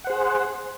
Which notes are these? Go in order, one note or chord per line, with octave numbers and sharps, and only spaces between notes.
G#4 C5 F#5